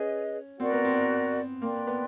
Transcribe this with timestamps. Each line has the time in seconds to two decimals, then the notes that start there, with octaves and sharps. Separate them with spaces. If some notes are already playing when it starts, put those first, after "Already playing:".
Already playing: C#4 G#4 B4 D#5
0.59 C4 F#4 A#4 D5 F#5
0.72 B3
0.85 C4
1.62 A#3 B4 D5 G5 C6
1.87 B3